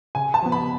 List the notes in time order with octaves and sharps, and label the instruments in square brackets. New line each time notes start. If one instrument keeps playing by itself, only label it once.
[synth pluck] C#3 [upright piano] G#5
[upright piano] A5
[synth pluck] F3 B3
[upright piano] B5